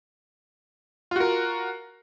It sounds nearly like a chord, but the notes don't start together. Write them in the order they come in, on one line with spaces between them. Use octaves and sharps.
F4 F#4 A#4